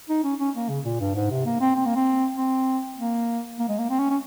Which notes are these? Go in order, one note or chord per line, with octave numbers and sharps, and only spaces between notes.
D#4
C#4
C#4
A#3
C#3
A#2
G2
G#2
C3
A#3
C4
C4
A#3
C4
C4
A#3
A#3
G#3
A#3
C4
C#4
C#4